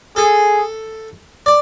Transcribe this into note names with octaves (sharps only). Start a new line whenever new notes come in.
G#4 A4
D5